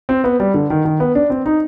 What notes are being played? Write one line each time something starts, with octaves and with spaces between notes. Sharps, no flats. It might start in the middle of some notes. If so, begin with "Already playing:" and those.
C4
B3
G3
D3
D#3
D#3
B3
D4
C4
D#4